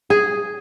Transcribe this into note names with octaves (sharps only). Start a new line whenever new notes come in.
G#4